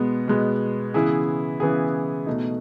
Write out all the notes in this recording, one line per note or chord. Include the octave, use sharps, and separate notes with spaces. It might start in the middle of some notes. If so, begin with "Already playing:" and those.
Already playing: B2 G#3 B3
B2 G#3 B3
C#3 E3 B3 E4 G#4
C#3 E3 B3 E4 G#4
B2 A3 D#4